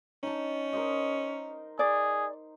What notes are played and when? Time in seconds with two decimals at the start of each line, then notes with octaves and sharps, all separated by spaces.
0.23 C#4 D#4 A5
0.73 A#4 C5 D#5
1.79 G#4 D5